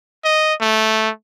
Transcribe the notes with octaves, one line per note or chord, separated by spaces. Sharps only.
D#5
A3